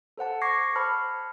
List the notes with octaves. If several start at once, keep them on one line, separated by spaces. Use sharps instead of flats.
A4 C5 F#5 A5
C#6 D6 G#6 A#6 C7
C5 A5 B5 F6 C#7